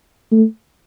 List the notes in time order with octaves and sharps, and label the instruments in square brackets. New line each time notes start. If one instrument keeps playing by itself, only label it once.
[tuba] A3